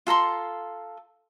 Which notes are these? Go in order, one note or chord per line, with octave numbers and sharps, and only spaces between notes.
F4 A4 A#5 C6